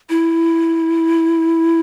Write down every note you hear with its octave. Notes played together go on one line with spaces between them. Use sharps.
E4